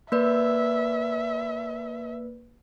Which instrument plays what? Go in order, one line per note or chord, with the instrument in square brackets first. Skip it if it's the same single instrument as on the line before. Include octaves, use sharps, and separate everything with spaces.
[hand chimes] A#3 B4 D5 [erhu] E5